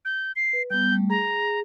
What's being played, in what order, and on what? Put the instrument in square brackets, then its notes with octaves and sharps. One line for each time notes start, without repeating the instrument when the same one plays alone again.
[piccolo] G6
C7
[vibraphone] B4
[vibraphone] G3 B3 [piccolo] G6
[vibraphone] G3 A3
[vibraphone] G#4 [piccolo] A#5